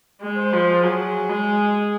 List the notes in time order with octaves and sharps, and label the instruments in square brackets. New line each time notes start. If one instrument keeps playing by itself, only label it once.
[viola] G#3
[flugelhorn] C5
[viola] F3
[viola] F#3 [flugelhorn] G#4
[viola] G#3